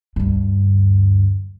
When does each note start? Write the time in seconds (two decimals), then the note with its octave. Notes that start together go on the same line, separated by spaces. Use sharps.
0.16 D2 G2